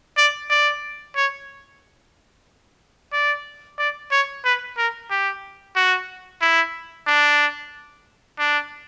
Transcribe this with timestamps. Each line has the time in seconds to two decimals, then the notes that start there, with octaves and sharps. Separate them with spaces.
0.17 D5
0.50 D5
1.16 C#5
3.13 D5
3.79 D5
4.11 C#5
4.44 B4
4.78 A#4
5.10 G4
5.76 F#4
6.42 E4
7.07 D4
8.39 D4